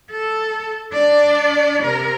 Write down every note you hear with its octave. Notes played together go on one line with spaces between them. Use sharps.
A4
D4 D5
C3 A#4